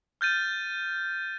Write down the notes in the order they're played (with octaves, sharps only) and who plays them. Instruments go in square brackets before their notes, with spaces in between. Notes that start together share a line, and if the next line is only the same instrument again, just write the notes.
[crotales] F6 G6 A6 D#7